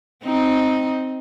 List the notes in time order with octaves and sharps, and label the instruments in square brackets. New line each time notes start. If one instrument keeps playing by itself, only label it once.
[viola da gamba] C4 D#4